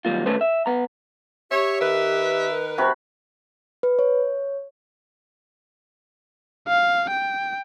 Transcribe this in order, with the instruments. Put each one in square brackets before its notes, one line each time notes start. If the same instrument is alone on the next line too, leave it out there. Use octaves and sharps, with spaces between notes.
[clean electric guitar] D#3 F#3 G3 A#3 F4
D#3 A3 C#4 A4 B4 C5
E5
B3 A#5
[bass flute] G4 [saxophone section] C#5 [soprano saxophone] E5
[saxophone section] D#3 A#4 B4 [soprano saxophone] E5
[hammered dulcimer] C3 F#4 B5
[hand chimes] B4
C#5
[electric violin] F5
G5